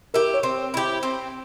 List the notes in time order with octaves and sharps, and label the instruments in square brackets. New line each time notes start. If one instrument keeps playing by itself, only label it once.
[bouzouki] E4 G4 [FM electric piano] A#4
[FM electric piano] C#5
[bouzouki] C4 [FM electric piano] C5
[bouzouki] E4 G4
C4